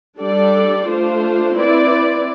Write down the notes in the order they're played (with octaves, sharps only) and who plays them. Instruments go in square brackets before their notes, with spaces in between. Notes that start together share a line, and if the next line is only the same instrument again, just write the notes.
[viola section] G3 D4 A4 D5
A3 D4 F4 C5
C4 E4 B4 D5